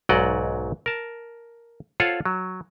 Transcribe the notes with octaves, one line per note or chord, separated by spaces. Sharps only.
B1 G#2 F#3 D5 D#5 F#5
A#4 A5
F4 A4 C5 C#5 F5 F#5
F#3